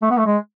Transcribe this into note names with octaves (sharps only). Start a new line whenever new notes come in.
A3
B3
A3
G#3